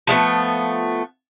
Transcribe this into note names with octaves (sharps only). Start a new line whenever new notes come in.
F3 G#3 A3 B3